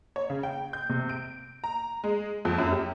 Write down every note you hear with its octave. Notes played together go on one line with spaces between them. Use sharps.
C#5
C#3
G5
G6
C3
D7
A#5
G#3
F2
F#2
G4